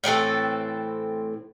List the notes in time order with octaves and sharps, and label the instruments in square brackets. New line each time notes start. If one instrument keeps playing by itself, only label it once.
[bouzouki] A2 E3 C4 A4